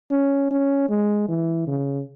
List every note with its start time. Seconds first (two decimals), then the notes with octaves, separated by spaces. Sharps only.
0.11 C#4
0.51 C#4
0.89 G#3
1.29 E3
1.67 C#3